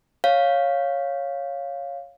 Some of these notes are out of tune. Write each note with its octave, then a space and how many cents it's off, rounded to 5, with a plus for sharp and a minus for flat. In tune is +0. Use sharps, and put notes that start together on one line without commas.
C#5 +0 F5 +5